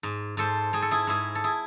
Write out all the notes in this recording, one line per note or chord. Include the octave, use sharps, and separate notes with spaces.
G#2
G#2 A4 C5
G#2 G#4
A4
E4 G#4
G#2 E4 G#4
A4
E4 G#4